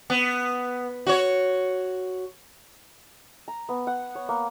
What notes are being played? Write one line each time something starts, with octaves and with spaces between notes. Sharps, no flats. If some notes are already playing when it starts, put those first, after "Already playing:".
B3
F#4 C#5
A#5
B3
F#5
C#5
A#3